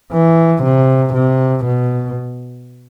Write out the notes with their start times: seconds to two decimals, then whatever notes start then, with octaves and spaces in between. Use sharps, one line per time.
0.13 E3
0.63 C3
1.14 C3
1.65 B2